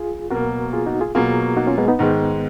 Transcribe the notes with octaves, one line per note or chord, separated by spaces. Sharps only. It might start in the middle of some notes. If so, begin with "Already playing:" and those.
Already playing: F4 G#4
B2 F#3 A#3 F#4 A#4
F4 G#4
D#4 F#4
F4 G#4
B2 F#3 A#3 F4 G#4
D#4 F#4
C#4 F4
G#3 B3
B3 D#4
G#2 D#3 G#3